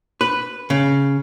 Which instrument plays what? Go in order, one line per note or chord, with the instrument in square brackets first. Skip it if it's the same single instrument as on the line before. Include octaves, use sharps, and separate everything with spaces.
[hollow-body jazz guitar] B4
C#3